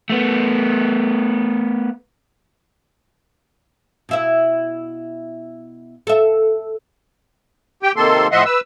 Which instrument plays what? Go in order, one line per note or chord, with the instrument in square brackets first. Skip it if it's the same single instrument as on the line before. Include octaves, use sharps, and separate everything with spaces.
[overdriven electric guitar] A3 B3
[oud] B2 E4 E5
A4 E5
[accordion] G4 G5
C3 D#3 A#3 A4 C6
A2 F3 D#5 E5 F#5 C6
B4 E6